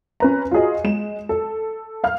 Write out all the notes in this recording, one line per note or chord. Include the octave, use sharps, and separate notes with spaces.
C#4 B4 A#5
F4 F#4 G#4 D#5
G#3 E7
A4
F5 F6